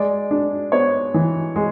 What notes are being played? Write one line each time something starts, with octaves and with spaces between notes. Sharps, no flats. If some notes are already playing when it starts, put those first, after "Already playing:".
Already playing: G#3 D5
D4
B3 C#5
E3
G#3